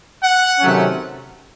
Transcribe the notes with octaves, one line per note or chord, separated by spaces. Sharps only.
F#5
C3 D#3 F#3 A3 C#4